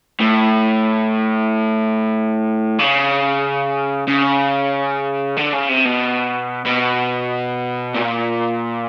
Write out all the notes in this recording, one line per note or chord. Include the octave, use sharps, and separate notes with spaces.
A2
C#3
C#3
D3
C#3
C3
B2
B2
A#2